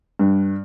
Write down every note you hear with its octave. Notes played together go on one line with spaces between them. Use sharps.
G2